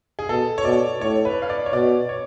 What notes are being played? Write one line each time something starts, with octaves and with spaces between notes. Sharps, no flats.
G#4
B2 A4
C#5
B2 D5
A2 C#5
B4
F5
D5
C#5
B2 D5
C#5